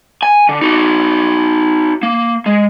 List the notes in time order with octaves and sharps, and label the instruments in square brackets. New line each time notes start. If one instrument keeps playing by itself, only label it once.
[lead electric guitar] G#5
D3
D#4 F#4
A#3
G#3